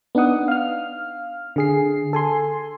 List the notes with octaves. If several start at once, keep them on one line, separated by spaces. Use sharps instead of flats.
B3 D4 D#4 F#5 D#6
F5 F6
D3 G#4 C7
A4 G#5 C6